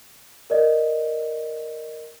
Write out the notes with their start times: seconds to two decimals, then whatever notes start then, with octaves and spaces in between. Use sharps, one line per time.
0.50 A#4 D5 D#5